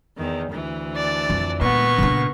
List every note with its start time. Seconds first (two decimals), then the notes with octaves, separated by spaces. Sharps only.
0.16 E2 D#3
0.50 D2 E3
0.96 D5 A5
1.30 F2
1.61 A#2 G#3 B3 C#6
1.98 C#3 D4